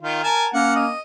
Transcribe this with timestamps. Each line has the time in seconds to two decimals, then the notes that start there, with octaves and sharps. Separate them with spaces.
0.02 D#3 F4
0.24 A#4 G#5 A5
0.54 A#3 C#4 F#5
0.76 D#5